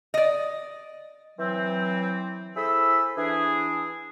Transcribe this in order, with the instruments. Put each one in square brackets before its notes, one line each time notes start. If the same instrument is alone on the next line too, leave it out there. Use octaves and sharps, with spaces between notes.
[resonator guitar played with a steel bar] D5 D#5
[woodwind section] E3 F#3 C4
E4 G#4 A4 C5 B5 E6
E3 D4 G#4